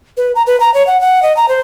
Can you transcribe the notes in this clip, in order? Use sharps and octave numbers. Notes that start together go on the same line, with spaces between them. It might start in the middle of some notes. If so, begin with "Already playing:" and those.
B4
A#5
B4
A#5
C#5
F#5
F#5
D#5
A#5
C5